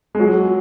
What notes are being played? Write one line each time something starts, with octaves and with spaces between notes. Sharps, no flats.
G#3
F#3